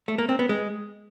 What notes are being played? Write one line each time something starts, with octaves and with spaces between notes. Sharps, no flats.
A3
A#3
C4
B3
G#3